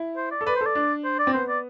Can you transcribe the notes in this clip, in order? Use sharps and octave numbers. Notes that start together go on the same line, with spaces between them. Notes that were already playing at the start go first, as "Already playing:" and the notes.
Already playing: E4
C5
D5
A4
B4 D5
C5
A4
D5
D4
C5
D5
C4
B3 C5
D5